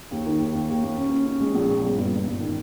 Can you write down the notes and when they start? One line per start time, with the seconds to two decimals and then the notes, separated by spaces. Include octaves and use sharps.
0.11 D#2
0.26 D#3
0.40 D#2
0.55 D#2
0.70 D#2
0.83 D#2
0.98 C#4
1.12 C#4
1.26 C#4
1.40 G#3
1.54 A#1
1.69 A#2
1.84 G1
1.98 G2
2.12 G1
2.27 G2
2.40 D#3